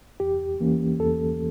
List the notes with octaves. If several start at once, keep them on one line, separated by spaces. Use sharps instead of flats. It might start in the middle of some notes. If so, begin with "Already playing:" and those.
E2 G4
E3 A#3 C#4
E2 A4